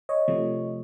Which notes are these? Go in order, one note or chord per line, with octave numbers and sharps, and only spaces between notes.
C#5 D#5
C3 F3 A3